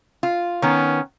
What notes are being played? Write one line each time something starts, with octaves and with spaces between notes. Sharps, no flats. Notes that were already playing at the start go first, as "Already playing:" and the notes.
F4
D#3 B3 C#4